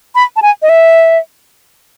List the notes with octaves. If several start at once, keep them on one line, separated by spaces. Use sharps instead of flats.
B5
A5
G#5
D#5
E5